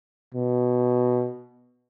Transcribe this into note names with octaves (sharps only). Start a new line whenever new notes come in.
B2